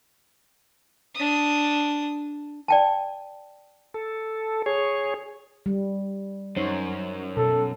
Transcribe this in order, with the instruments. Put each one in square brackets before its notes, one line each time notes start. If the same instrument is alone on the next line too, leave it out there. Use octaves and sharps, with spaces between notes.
[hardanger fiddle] D4 D#6
[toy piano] D5 G5 A5
[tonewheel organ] A4
G#4 C#5
[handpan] G3
[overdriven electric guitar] F#2 [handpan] D#4 C5 C#5
[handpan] B2 [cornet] A4